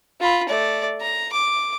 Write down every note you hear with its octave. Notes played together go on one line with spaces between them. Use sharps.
F4 B5
A3 D5
A#5
D6